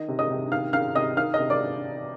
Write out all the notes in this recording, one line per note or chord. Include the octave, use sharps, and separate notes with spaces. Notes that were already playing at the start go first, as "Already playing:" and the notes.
Already playing: D#3 D#5
C3
D#5 D#6
C3
D#3 F5 F6
D#3 F5 F6
C3 D#5 D#6
D#3 F5 F6
D#5 D#6
C3
D5 D6